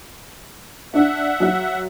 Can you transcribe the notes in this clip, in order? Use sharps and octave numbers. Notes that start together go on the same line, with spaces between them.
D4 E5 F#5
F#3